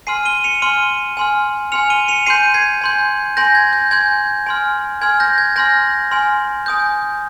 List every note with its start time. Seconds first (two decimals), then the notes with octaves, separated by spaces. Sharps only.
0.07 G#5 C6 F6 C7 D#7
0.25 D#7 G7
0.44 C#7 F7
0.62 G#5 C6 F6 D#7 G7
1.17 G#5 C6 F6
1.72 G#5 C6 F6 C#7 F7
1.90 D#7 G7
2.08 C#7 F7
2.26 G#5 C6 G6 C7 D#7
2.54 G#6 C7
2.81 G#5 C6 G6
3.37 G#5 C6 G6 A#6
3.55 G#6
3.73 G6
3.91 G#5 C6 G6 G#6
4.46 G#5 C6 F6
5.01 G#5 C6 F6 G#6
5.20 G6 A#6
5.38 G#6
5.56 G#5 C6 F6 G6 A#6
6.11 G#5 C6 F6
6.66 G#5 D#6 G6